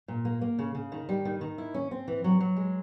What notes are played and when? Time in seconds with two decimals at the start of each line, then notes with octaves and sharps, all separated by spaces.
0.08 A#2
0.25 A#3
0.41 A#3
0.59 C#3
0.75 C#3
0.92 D#3
1.09 G3
1.25 D#3
1.41 D#3
1.58 E4
1.74 C#4
1.91 C4
2.08 E3
2.24 F#3
2.40 F#3
2.57 G#3